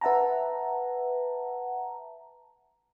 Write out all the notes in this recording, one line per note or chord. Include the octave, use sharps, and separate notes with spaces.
B4 E5 F#5 A5 A#5